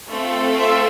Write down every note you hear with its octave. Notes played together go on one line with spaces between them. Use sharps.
A3 C4 F4 A4
E5